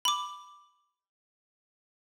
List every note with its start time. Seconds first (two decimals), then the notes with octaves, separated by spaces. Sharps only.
0.05 B5 D6